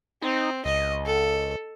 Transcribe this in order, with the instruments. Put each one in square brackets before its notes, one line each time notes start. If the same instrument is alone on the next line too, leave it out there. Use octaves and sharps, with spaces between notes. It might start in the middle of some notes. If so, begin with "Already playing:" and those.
[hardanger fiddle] C4 [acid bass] D#4
[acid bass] C#2 [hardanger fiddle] D#5
[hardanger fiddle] A4